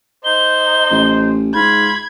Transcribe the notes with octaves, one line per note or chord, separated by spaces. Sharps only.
D#4 C5 G7
A1
G#2 F4 B5 G#6